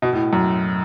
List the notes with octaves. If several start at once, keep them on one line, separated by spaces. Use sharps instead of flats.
B2
A2
F#2